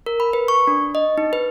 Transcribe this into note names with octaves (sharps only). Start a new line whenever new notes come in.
A#4
B5
B4
C#6
D4
D#5
D#4
B4